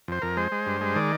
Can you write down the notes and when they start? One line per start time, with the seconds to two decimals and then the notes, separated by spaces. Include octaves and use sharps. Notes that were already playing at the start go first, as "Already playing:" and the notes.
0.08 F2 C5
0.22 F2 A#4
0.37 G#3 C5
0.52 G#3
0.67 G2
0.81 G#3
0.95 D#3 D5